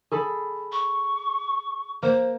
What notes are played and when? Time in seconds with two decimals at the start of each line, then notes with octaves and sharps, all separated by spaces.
0.11 G#4 A4 B5
0.72 C#6
2.03 A#3 C5